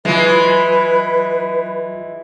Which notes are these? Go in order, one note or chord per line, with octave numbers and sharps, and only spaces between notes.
E3 F#3 G#3 F4 B4